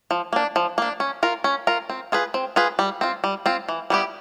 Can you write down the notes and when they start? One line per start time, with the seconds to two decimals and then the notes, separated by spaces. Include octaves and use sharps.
0.11 F3
0.33 A#3 D4
0.56 F3
0.78 A#3 D4
1.00 C#4
1.23 F4 A#4
1.44 C#4
1.67 F4 A#4
1.90 C4
2.12 F4 G#4 B4
2.34 C4
2.56 F4 G#4 B4
2.79 G3
3.01 C4 F4
3.24 G3
3.46 C4 F4
3.68 E3
3.90 G3 B3 E4 G4